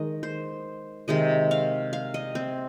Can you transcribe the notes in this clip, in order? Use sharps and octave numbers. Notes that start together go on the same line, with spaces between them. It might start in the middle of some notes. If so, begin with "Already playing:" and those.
Already playing: D#3 G#3 D#5
C5
C3 D#3 G#3 D#5
F5
F5
D#5
C4